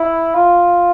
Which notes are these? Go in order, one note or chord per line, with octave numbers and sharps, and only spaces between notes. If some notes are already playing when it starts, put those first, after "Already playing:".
Already playing: E4
F4